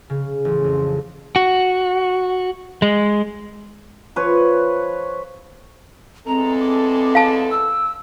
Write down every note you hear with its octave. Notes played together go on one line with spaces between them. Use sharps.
C#3
A1
F2
F#4
G#3
F3 B4 C#5
E2 G#3 C4 A4 A#5
D6
F5 A5
E6